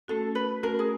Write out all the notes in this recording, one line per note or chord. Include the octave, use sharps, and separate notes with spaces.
A3 C#4 F#4 A4
B4
A3 C#4 F#4 A#4
G#4